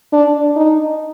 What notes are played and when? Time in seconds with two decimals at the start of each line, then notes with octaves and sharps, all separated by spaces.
0.12 D4
0.56 D#4